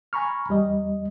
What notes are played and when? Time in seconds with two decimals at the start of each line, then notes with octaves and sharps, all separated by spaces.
0.13 G#5 A#5 B5 C#6 F6
0.49 E2 G3 D#5